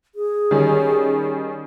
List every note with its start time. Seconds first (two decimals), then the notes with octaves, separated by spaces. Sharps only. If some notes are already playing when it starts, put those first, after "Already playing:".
0.15 G#4
0.51 D#3 G3 C#4